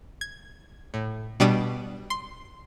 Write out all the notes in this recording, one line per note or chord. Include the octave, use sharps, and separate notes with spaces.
G#6
A2
B2 G3 D4 D5 D#6 D7
C6